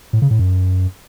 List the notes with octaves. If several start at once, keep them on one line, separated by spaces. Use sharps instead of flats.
A2
C#3
A2
F#2